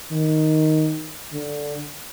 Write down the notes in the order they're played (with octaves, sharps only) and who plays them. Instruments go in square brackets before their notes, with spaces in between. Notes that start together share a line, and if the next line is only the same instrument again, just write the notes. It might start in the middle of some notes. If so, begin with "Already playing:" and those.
[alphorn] D#3
D3